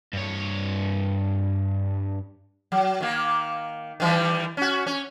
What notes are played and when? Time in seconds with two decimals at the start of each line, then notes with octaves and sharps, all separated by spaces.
0.13 G2 C#5
2.72 F#3
3.01 D#3 A#3
4.00 D#3 E3 G3
4.57 C#4 F#4
4.87 C#4